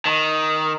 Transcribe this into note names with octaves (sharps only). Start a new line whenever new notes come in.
D#3